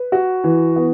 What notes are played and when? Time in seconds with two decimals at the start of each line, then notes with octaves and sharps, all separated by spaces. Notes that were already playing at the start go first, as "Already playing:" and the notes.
Already playing: B4
0.12 F#4
0.44 E3
0.76 B3